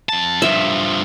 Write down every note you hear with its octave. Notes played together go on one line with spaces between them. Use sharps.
F2 A5
G2 F3 E5